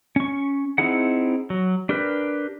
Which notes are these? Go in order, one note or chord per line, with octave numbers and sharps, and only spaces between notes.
C#4 C#6
C4 D#4 E4 G#4 F#5
F#3
D4 G4 A#4 B4